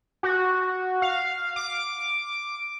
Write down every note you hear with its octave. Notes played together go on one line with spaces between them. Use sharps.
F#4
F5
D6